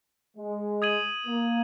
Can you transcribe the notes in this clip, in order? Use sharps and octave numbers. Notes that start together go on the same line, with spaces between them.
G#3
D#6 G#6 D#7 F#7
A#3